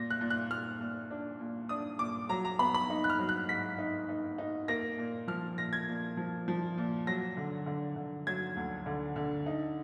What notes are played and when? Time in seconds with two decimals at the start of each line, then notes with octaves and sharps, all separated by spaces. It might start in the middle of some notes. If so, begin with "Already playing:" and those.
Already playing: A#2 A#6
0.10 F#6
0.21 A#2
0.30 F#6
0.50 A#2 F6
0.81 A#2
1.11 D4
1.40 A#2
1.69 D4 D#6
1.99 A#2 D6
2.29 F#3 A#5
2.45 A#5
2.59 B3 B5
2.74 B5
2.90 D#4
3.04 F#6
3.10 F6
3.19 F#3
3.29 F#6
3.49 G#2 B6
3.78 D#4
4.09 D#4
4.38 D#4
4.68 A#3 A#6
4.98 A#2
5.28 F3 F6
5.58 A#2 A#6
5.73 G#6
5.88 A#2
6.17 F3
6.48 F3
6.78 A#2
7.07 F#3 A#6
7.37 D3
7.66 D3
7.96 D3
8.27 F#3 G#6
8.57 D2
8.86 D3
9.16 D3
9.46 D#4